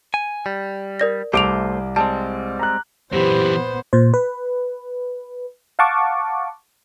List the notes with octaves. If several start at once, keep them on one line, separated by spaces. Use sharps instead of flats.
G#5
G3
A#4 D5 A#6
C2 A3 G4 C5 D6 D7 F7
G3 G#3 C4 A5
A#5 F#6
F#2 A#2 E3 B3 G4 C5
A#2 C5
B4
F5 F#5 A5 C#6 D6